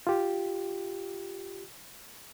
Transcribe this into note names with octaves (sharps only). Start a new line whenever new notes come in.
F4 G4